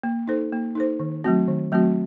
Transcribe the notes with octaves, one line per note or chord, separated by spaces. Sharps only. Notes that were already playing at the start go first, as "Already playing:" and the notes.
A#3
D#4 A4 C5
A#3
D#4 A4 C5
D#3
F#3 A3 C4 F#4
D#3
F#3 A3 C4 F#4